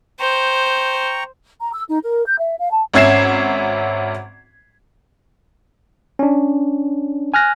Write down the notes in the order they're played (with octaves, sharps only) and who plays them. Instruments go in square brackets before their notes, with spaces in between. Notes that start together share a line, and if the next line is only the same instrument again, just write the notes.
[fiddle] C5 [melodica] G5 A#5 C#6
[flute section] A#5
E6
D#4
A#4
G6
E5
F5
A5
[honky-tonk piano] G#1 C#4 E5 G#6 C7 E7
[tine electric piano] C#4 D4
G#5 F6 F#6 A#6